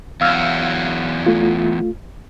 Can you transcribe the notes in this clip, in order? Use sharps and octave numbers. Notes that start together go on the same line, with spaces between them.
E2 F#3 F5 E6 F6
A3 F4